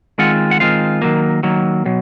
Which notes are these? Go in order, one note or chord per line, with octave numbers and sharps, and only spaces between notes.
D#3 G#3 C4 F4 F#5
F#5
D#3 G#3 C4 F4 F5
D#3 F#3 A#3
D#3 F#3 A#3
B2 F#3